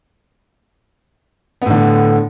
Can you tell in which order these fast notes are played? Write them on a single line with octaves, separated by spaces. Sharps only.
B3 A2 D3